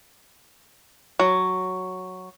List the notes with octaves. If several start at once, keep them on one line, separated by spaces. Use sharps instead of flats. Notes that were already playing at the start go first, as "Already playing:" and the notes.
F#3